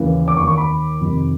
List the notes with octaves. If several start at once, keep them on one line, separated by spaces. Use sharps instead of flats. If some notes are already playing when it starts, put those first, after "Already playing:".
Already playing: D#2 C#3 E3
D6
D#2 D#3 C#6
C#6
B5
F2 C3 D#3